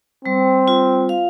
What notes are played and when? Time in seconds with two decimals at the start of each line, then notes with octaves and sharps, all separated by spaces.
0.24 G3 C4
0.68 F4
1.09 F5